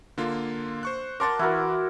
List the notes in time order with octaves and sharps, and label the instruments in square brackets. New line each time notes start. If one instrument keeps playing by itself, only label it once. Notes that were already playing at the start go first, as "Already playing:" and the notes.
[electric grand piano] D3 A#3 F4
C5 C#6 F#6
[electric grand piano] A#4 A5 A6 [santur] F#5 C6 D6
[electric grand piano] E3 [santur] E4 F#4 A#4